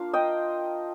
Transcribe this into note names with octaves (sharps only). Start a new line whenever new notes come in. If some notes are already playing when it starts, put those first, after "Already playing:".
Already playing: A#3 D4 F4 F5
D#5 G5